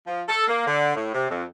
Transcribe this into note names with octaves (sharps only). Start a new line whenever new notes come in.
F3
A4
A#3
D3
A2
C3
F2